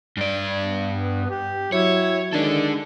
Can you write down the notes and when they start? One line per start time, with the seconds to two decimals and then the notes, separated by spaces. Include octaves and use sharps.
0.17 G2 D5
0.58 B3
1.30 G4
1.73 F#3 E4 C#5
2.33 D#3 G#3 D4 A4